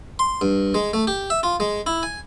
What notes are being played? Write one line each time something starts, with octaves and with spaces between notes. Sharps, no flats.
C6
G2
G#3
A3
G4
E5
F4
G#3
E4
G#5